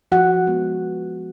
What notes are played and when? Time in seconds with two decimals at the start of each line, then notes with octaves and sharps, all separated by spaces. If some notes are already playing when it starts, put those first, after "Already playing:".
0.12 F3 F#4 F#5
0.47 G#3 B3